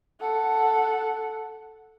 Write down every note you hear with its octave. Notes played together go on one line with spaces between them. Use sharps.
A4 F#5